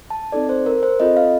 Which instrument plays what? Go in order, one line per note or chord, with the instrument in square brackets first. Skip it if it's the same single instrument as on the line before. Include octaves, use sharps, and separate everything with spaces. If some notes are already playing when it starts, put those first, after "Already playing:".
[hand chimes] A5
C4 D#4 A4 D5
C5
A#4
C5
C4 F4 A4 D#5
F5